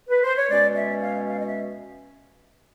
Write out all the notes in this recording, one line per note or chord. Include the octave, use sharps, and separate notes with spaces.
B4
C5
C#5
B2 G#3 C#4 D5
E5
F5
F5
D#5
E5